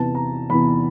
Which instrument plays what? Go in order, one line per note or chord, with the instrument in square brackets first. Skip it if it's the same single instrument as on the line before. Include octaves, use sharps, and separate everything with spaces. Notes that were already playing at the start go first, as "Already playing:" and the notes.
Already playing: [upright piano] E2 C3 E3 A5
A#5
E2 C3 E3 B5